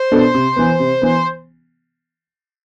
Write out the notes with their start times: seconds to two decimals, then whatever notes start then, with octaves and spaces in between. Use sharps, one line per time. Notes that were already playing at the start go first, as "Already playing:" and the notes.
Already playing: C5
0.12 B2 B3 D4 A4
0.35 C3
0.56 E3 B3
0.80 C3
1.02 E3 B3